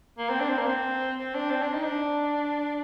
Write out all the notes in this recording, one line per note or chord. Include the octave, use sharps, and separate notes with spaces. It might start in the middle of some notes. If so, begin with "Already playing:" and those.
A#3
C4
D4
C4
A#3
C4
C4
D4
C4
D4
D#4
D4